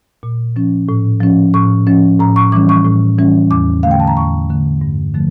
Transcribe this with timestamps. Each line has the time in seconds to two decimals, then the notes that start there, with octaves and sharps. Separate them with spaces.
0.23 A#2
0.56 F3 C#4
0.89 A2
1.21 F3 C#4
1.54 A2 C#6
1.87 F3 C#4
2.19 A2 A#5
2.36 C#6
2.52 E3 G3 C#4 D6
2.69 C#6
2.85 A2
3.18 E3 G3 C#4
3.51 E2 D6
3.83 D3 A3 F5
3.91 G5
4.00 A5
4.07 A#5
4.17 E2 C#6
4.49 D3 A3
4.81 G2
5.14 D3 F3 A3